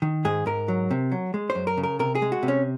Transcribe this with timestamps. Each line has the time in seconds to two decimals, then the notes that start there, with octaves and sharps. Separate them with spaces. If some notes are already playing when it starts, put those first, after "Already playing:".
0.02 D#3
0.25 G#2 G#4
0.46 G#2 A#4
0.68 F#3
0.91 C3
1.12 F#3
1.34 G#3
1.50 C5
1.55 F#2
1.67 A#4
1.77 C#3
1.83 A#4
1.99 C3 A#4
2.15 G#4
2.22 G#3
2.32 F#4
2.43 C3
2.48 C#4